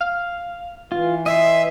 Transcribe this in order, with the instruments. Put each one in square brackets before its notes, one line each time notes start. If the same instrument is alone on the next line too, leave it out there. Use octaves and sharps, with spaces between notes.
[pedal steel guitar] F5
[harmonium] E3 [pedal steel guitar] F4
[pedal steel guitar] D#5 C6 [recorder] E5